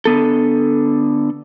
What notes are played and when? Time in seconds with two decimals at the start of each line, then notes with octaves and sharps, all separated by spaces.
0.05 D3 B3 A4